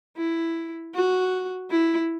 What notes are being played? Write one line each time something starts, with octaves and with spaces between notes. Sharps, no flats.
E4
F#4
E4